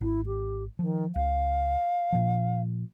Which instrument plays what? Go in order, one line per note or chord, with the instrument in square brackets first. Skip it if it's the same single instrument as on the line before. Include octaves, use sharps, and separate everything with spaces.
[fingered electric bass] G#1 [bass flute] E4
[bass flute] G4
[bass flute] D#3 [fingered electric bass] F3
[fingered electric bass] C#2 [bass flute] F5
[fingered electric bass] A#2 F3